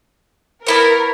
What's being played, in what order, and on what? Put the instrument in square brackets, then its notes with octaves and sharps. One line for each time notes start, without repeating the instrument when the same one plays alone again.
[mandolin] B3 E4 C#5 [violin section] A#4